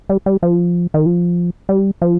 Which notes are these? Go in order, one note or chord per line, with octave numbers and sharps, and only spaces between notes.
G3
G3
F3
D#3
F3
G3
F3